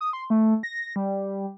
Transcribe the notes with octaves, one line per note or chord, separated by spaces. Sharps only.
D#6
C6
A3
A#6
G3